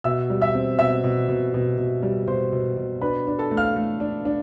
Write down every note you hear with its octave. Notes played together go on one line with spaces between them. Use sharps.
B2 E5 E6
G3
E5 E6
C4
B2 E5 E6
B2
B2
B2
B2
G3
B2 C5 C6
B2
B2
D4 B4 B5
D4
A4 A5
A3
F5 F6
A3
D4
D4